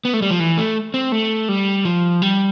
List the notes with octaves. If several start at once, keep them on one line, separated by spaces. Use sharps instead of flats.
B3
A3
G3
F3
E3
A3
C4
A3
G3
F3
G3